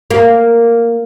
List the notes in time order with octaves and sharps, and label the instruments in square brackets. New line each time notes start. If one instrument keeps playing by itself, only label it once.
[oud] A#3